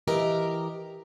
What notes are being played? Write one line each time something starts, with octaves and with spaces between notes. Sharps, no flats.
E3 G4 A#4 D#5